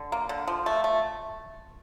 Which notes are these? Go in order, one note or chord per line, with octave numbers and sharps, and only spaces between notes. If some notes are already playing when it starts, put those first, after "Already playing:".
Already playing: D3
A#3
D3
F3
A3
A3